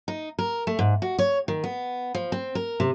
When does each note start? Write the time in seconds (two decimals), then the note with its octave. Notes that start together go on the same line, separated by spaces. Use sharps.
0.08 D#4
0.39 A#4
0.67 A3
0.79 G#2
1.02 F#4
1.19 C#5
1.48 D#3
1.64 B3
2.15 F3
2.32 C4
2.55 A#4
2.80 C3